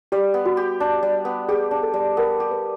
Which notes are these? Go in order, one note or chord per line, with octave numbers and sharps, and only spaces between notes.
G3 G4
B3
F#4
G4
D4
G3
B3
G4 G#4
D4
A4
G3
B3 A#4
G4
B4